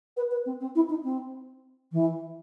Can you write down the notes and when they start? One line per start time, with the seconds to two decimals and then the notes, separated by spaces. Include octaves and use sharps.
0.17 B4
0.31 B4
0.46 C4
0.60 C4
0.75 E4
0.89 D#4
1.04 C4
1.92 E3